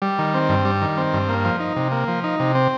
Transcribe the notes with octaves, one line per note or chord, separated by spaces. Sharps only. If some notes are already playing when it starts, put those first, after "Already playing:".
G3
D#3
C4
G2
G3
D#3
C4
G2
A#3
F3
D#4
C3
A#3
F3
D#4
C3
C4